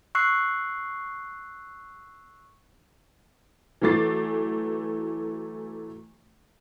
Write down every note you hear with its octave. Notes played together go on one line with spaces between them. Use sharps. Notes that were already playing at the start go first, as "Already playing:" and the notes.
C#6 E6 F#6 C7
E3 F#3 A3 D6 A6 C7